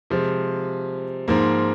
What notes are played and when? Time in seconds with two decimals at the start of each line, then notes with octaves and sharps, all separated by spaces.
0.10 C3 F3 G#3
1.28 G#2 F3 A#3